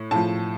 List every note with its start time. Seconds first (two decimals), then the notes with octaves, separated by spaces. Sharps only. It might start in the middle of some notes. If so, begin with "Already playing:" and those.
Already playing: A2
0.11 A2 F3 A5